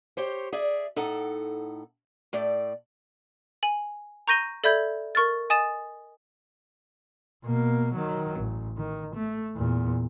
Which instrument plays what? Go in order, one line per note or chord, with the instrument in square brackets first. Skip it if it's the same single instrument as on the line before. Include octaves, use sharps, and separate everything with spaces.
[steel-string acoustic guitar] G4 C5 C#5
G#4 D5 E5
A2 D#4 A4 F#5
A2 A3 D5
[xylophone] G#5 F#7
A#5 C#6 G6 A#6 D#7 G7
A4 D5 E5 B5 G6 G#6
A#4 C#6 F6 A6
D#5 G#5 D#6 A6 E7
[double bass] B2 A#3
D#3 F#3
A1
D#3
A3
E2 A#2